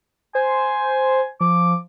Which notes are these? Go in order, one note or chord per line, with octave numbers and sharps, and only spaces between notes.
C5 G#5
F3 D6